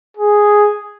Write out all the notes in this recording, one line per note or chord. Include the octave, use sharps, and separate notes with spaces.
G#4